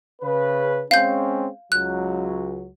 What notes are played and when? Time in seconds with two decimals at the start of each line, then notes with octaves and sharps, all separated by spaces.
0.22 C#3 B4
0.91 G#3 C4 C#4 F5 G6
1.72 C#2 F#3 F#6